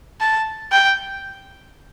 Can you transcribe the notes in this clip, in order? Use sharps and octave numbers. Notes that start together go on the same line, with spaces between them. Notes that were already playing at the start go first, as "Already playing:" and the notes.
A5
G5